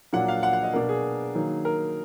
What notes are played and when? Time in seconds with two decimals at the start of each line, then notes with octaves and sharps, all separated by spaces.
0.13 A#2 F#3 A#3 D4 F#5
0.28 F5
0.43 F#5
0.53 F#5
0.63 D#5
0.73 B2 A#3 D4 A#4
0.89 G#4
1.34 D#3 F#3 A#3 D#4
1.65 A#4